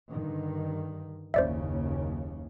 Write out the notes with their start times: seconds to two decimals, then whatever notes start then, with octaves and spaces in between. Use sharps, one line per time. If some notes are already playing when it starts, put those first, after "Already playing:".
0.11 G2 D3 D#3
1.34 F#1 D#2 C#3 C5 D5 E5